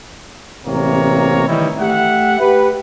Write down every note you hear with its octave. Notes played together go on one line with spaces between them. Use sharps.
A1 C3 A#3 C#5 A#5
D#3 E3 G3 D#4 E4
A3 G4 E5 F#5
G4 B4